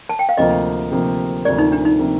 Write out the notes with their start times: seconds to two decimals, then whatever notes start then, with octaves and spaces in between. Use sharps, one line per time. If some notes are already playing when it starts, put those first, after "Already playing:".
0.09 A5
0.19 G5
0.29 F5
0.37 D2 C3 F3 A#3 D#5
0.91 D2 C3 F3 A#3
1.45 D2 C3 F3 A#3 D5
1.58 D#4
1.72 D4
1.85 D#4
1.99 C3 F3 A#3